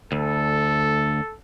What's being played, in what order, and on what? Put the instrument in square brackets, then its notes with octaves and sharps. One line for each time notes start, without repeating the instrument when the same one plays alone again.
[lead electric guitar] D2 [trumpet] A4